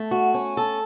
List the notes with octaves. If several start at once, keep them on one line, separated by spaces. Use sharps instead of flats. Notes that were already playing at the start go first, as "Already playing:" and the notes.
Already playing: A3
F#4
C#4
A4